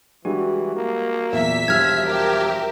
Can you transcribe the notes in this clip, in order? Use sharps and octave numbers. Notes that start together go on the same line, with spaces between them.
E3 G3 G#3 D4 F#4
A#3
E2 A#2 F#3 E5 B6
E1 F3 G3 E6 F6 G#6
G4 A#4 E5